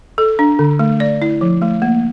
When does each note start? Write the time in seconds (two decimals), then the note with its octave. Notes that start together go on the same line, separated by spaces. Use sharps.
0.18 A4
0.39 D4
0.59 D3
0.79 A3
1.00 D5
1.22 E4
1.41 F3
1.62 A3
1.82 A#3